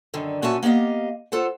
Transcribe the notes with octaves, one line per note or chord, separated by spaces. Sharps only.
F#2 D3 D#3
A#2 C#4 F#4 E5 G#5 A5
A#3 B3 G4 D#5 F5
F4 A4 C5 F#5